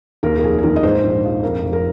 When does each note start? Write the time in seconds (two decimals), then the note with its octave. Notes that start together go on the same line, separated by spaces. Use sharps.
0.23 D#2 A#4
0.38 A#4
0.43 F1 G#4
0.58 G#4
0.63 D#3 A#4
0.76 D#5
0.83 G#2 C5
1.03 A#1
1.23 F3
1.43 F2 A#4
1.63 F1
1.73 A#4